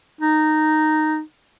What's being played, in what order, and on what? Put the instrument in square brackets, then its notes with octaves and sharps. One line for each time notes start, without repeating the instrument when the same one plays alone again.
[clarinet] D#4